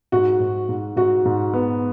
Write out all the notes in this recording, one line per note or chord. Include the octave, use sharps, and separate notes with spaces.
G#2 F#4
G#2
G#2
G#2 F#4
G#2
B3